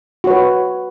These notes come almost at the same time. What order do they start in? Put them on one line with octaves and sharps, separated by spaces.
F#4 C#5 B4